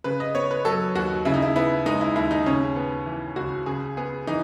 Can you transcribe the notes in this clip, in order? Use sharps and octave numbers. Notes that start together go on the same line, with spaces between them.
C#3 B4
D#5
B3 C#5
B4
F#3 A4
D#2 F#4
C#3 E4
D#4
E4
B3 E4
G#3 D#4
E4
D#2 E4
D#4
C#3 C#4
B3
E3
C#2 F#4
C#3 G#4
B3 G#4
E3 D#4